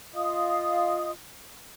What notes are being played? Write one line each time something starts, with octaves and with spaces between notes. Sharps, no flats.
F4 D#5 F5 D#6